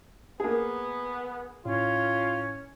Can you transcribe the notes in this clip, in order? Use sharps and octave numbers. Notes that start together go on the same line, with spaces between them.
A#3 B3 G#4
A2 C#4 F4